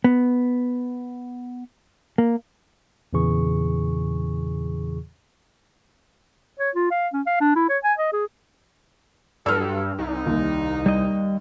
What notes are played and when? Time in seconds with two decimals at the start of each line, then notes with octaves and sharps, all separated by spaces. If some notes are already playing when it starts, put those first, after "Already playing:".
0.04 B3
2.18 A#3
3.13 E2 A#2 C#3 E3 G#4 C#6
6.59 C#5
6.75 F4
6.91 F5
7.13 C#4
7.27 F5
7.41 D4
7.56 E4
7.69 C#5
7.84 G#5
7.98 D#5
8.13 G#4
9.46 G2 F#3 A4 E6 F6
9.99 C2 D#4
10.26 D#2
10.86 G3 D#5